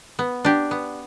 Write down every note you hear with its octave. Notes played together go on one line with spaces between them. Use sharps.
B3
D4 G4
B3